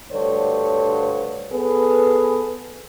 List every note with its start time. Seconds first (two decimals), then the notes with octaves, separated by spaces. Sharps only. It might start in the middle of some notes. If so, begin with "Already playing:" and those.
0.12 D2 G2 D3 C5 C#5
1.52 B3 G#4 A4 B4